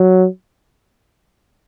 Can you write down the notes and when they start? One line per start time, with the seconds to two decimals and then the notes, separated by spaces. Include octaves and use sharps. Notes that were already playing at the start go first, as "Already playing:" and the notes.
Already playing: F#3